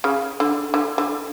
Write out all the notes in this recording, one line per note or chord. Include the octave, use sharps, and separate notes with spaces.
C#3
D3
D3
D3